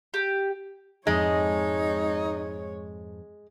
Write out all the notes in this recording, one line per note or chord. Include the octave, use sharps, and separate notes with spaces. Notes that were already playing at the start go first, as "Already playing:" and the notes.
G4
F2 G#2 G#3 D#4 C#5